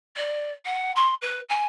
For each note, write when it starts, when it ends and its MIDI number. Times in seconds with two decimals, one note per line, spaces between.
0.16 0.51 74
0.65 0.92 78
0.96 1.14 84
1.21 1.40 71
1.49 1.66 80